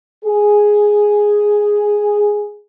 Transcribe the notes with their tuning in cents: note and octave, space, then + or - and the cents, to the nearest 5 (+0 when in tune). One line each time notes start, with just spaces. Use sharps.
G#4 +0